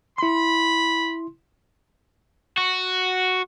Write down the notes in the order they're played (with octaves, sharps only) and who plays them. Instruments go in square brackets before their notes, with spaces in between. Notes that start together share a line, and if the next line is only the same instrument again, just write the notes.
[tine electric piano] E4 C6 [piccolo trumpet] B5
[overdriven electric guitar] F#4